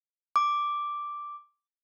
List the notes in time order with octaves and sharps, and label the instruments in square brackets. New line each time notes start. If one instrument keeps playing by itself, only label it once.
[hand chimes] D6